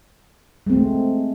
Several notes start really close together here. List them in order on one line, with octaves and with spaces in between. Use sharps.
G#3 C4 A3